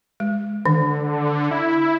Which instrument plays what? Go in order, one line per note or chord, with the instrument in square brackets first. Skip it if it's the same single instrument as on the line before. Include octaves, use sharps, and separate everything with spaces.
[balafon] G#3
[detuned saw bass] D3 [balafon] D#3
[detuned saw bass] E4